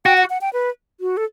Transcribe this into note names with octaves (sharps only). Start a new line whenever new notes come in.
F#4 G5
F#5
F#5
G5
B4
F#4
A4